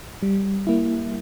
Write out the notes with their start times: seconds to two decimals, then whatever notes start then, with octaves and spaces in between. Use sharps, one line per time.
0.23 G3
0.67 A#3 E4